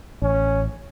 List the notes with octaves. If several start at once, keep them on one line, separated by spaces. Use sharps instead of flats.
A1 C#4